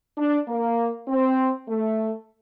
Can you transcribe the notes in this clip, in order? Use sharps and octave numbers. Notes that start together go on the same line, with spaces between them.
D4
A#3
C4
A3